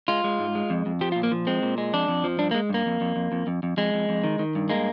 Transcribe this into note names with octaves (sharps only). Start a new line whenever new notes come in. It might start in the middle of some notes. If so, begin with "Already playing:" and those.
G#3 F4
G#3
G#2
G#3
F2
F2
F3 G4
F4
A#2
A#3
F3
G#3 C4
A#2
G#3
F2 D4
F2
F3
G2 D4
A#3
G#3
G2 A#3
F2
F2
F2
F2
F2
F2
F2 G#3
F2
F2
D#3
D#3
G2
G#3 A#3